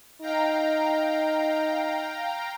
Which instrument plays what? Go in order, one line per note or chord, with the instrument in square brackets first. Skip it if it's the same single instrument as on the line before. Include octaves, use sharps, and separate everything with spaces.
[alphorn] D#4 [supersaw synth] F5 G5 A#5